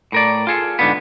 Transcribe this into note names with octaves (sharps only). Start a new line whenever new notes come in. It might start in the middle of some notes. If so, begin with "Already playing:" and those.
A2 A#4 D5
F4 G#4 A4
G#2 D3 B3